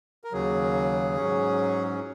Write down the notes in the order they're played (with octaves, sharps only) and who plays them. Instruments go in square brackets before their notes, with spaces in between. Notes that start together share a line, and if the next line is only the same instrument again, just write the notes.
[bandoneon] A#4
D#2 C#3 F#3 G#4
G#2 F#3 C#4